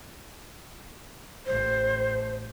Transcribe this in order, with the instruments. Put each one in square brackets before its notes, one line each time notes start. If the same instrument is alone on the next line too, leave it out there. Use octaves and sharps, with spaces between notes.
[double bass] A1 A2 [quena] C5